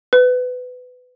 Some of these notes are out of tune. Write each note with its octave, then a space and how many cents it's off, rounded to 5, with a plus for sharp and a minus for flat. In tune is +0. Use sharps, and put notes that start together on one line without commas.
B4 +20